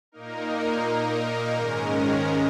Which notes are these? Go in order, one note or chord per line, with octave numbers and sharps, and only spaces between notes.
A#2 A#3 D#4 A#4
G#2 D#3 G#3 C#4 A#4